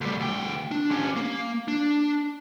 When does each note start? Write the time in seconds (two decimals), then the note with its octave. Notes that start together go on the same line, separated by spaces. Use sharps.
0.01 D2 G3
0.20 D2 G5
0.71 D4
0.91 C#4 G4
1.16 A#3
1.68 D4